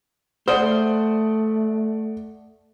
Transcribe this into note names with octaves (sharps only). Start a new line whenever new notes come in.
A3 C5 D5 F#5 D#6